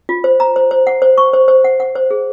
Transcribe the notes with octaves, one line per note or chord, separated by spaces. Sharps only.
F4
C5
A#5
C5
C5
F#5
C5
C#6
C5
C5
F#5
F#5
C5
G#4